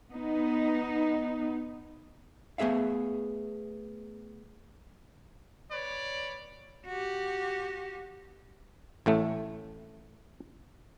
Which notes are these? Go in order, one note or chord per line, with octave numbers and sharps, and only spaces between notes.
B3 D#4
A3 B3 G#4 E5 F5
B4 C#5 D5
F#4 G4
A1 A2 A3